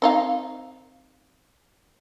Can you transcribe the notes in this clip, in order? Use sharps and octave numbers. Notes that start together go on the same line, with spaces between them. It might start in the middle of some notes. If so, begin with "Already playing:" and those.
C4 D#4 F5